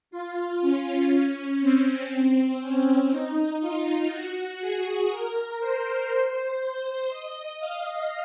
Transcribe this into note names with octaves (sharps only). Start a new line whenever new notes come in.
F4
C#4
C#4
C4
C#4
D#4
F4
F#4
G#4
A#4
C5
D#5
F5